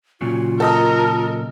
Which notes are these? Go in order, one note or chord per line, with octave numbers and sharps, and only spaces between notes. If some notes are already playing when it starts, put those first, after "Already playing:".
A#2 C#3 F#3 F4
A4 A#4 D#5 D#6